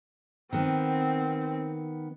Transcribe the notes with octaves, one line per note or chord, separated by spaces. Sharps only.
D#3 B3 C4